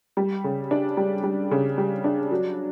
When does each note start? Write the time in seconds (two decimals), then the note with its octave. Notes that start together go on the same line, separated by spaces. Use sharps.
0.17 G3
0.44 C#3
0.71 D4
0.97 G3
1.23 G3
1.51 C#3
1.78 G3
2.04 D4
2.32 F#3